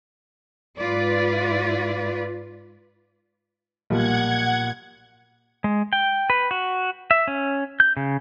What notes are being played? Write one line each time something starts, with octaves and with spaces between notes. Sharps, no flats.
G#2 F4 B4 D5
B1 A#2 F3 G3 F#5 G#6
G#3
G5
B4
F#4
E5
C#4
G6
C#3